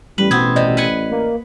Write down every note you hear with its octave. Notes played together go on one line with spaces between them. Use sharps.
A1 G3 B4 F#7
B2 B3 C4 G#6
C3 D5 D#5
B4 F#5 G#5
A#3